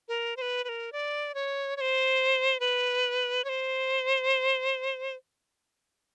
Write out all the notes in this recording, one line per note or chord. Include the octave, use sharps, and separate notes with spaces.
A#4
C5
B4
B4
A#4
D5
C#5
C#5
C5
B4
C#5
C5